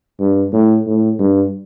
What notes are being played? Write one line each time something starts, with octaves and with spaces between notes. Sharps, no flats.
G2
A2
A2
G2